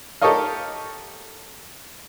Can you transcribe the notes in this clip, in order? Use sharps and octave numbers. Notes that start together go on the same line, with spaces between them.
G4 A4 A#4 C#5 D#5 F5